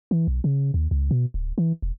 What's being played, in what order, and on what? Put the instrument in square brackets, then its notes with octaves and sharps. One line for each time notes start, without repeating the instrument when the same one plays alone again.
[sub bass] E3
B1
C#3
D#2
C#2
B2
D1
E3
E1